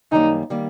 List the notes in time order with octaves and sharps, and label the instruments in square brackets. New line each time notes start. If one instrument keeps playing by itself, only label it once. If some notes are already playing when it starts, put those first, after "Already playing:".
[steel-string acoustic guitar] F#2 D#3 G3 A#3 [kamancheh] D#4
[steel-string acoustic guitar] D#3 G3 A#3